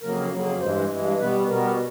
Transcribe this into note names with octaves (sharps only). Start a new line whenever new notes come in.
F2 C#3 F#3 A#3 A#4
F2 C#3 F#3 A#3
G2 E3 G#3 C5
G2 E3 G#3
B2 G3 B3 B4
B2 G3 B3 A#4